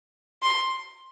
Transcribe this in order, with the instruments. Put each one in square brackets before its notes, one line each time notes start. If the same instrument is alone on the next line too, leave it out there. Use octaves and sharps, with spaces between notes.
[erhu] C6